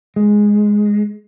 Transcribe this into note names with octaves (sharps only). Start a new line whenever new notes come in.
G#3